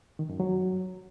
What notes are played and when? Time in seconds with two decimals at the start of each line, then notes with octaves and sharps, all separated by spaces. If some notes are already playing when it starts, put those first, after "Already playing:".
0.19 D#3
0.29 F#2
0.40 F#3